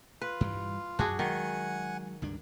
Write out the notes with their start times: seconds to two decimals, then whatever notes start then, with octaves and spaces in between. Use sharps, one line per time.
0.22 F4 B4
0.41 G2 E3 G3
0.99 F#2 D4 F#4 G#4
1.19 D#3 F#3 G#3 F#5 G#5
2.22 C#2 G2 D4